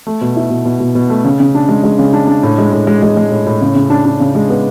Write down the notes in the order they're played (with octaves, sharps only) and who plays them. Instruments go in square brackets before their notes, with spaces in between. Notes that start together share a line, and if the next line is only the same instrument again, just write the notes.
[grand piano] A3
B2
E4
B2
B2
B2
B2
A3
C#3
C#3
D4
G#3
G#3
C#3
D4
D4
A2
G#3
A2
G#3
G#3
G#3
A2
A2
C#3
C#3
D4
D4
C#3
G#3
B3